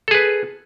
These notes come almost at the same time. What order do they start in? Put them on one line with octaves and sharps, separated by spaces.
A4 G#4 B4